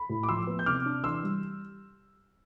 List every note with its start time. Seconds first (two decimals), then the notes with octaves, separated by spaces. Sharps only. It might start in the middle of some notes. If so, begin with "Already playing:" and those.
Already playing: B5
0.09 A2
0.23 D6
0.29 F3 C6 E6
0.47 B3
0.59 G6
0.66 C3 D6 F6
0.86 D4
1.04 E3 C6 E6
1.23 G3